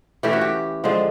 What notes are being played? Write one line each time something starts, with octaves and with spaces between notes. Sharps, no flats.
E3 A3 C#4 E4 G4
F#4
G4
D3 F3 G#3 C4